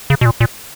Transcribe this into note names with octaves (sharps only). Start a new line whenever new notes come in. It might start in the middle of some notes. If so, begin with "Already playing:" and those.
C#3
B2
A#2
A#2